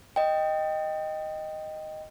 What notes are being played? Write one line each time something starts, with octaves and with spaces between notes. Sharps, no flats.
D#5 G5